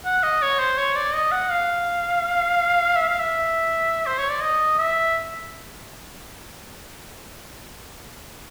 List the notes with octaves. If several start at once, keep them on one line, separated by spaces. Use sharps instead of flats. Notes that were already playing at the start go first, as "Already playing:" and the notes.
F#5
D#5
C#5
C5
C#5
D5
D#5
F#5
F5
E5
F5
E5
C5
C#5
D5
D#5
E5